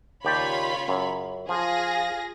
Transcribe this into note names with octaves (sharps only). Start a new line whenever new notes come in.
D#2 C#3 F4 G4 C#5 D5 B5
F#2
F3 F4 G#4 F5 A#6